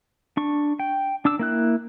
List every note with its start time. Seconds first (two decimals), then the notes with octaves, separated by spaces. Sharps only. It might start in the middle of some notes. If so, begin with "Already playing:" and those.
0.37 D4 C#6
0.79 G5
1.25 D4 D6 E6
1.39 A#3 E4 F#6